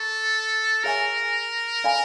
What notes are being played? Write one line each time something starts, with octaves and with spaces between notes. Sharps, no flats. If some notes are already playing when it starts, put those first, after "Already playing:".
Already playing: A4 A#4 A#5 C#6
G#4 A#4 C#5 E5 G#5 C#6
A4 D5 F5 G#5 B5